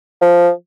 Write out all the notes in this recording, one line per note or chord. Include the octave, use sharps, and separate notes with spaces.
F3